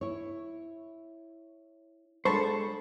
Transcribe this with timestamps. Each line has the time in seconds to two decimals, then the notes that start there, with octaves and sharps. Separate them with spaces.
0.01 E4 C#5
2.25 G#3 D4 F4 A4 C5 A5 B5 C#6